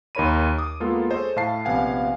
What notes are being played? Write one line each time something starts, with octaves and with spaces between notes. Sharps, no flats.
D#2 D#4 A#4 C#5 B5 D#7
D6 D#6
G#3 A#3 B3 F4 A4
G#4 A4 C5 C#5 D#5
A2 F5 A5 C7
A#1 C3 B3 F5 F#5 G#5